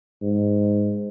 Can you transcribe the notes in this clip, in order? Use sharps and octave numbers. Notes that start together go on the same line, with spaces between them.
G#2